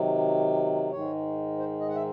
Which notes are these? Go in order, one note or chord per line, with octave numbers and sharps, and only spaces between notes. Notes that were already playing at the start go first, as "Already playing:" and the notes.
Already playing: C3 D#3 F#3
G#2 D#3 G#3 C#5
C5
D#5
F#5
E5